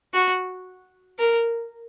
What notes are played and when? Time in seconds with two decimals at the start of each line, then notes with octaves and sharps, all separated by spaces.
0.14 F#4
1.19 A#4